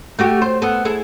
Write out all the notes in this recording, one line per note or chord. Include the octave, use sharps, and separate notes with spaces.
A3 F#4 G4
C5
B3 A4
E4 G#4 A4